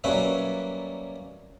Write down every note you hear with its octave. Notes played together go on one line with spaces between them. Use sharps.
F#3 G3 A#3 C#4 B4 E5